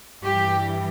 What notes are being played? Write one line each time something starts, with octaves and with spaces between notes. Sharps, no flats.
G2 E3 G4